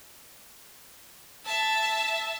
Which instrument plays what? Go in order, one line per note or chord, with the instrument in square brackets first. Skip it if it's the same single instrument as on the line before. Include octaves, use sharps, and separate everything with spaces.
[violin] E5 A5